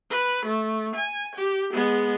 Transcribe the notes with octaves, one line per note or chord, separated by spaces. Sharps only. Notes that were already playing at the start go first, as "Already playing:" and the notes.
B4
A3
G#5
G4
G#3 B3